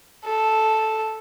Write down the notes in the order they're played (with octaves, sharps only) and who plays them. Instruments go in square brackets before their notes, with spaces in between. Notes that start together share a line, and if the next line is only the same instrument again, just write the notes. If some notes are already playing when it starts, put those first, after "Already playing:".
[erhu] A4